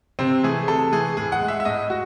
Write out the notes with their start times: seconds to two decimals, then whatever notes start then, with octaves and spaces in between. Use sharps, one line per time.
0.19 C3 C4
0.43 E3 A3 G#4
0.68 C3 A4
0.92 E3 A3 G#4
1.17 A2 G#4
1.32 F#5
1.41 G#3
1.48 E5
1.60 E5
1.65 A2 D#5
1.90 F#4